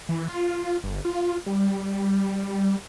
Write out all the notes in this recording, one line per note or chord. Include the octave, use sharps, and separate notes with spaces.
E3
F4
G1
F4
G3